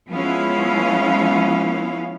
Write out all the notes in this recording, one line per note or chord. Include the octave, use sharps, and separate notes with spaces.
F3 G#3 B3 C#4 E4 F5